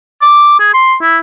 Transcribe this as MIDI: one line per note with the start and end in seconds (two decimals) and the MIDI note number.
0.22 0.56 86
0.60 0.72 68
0.74 0.95 84
1.02 1.18 64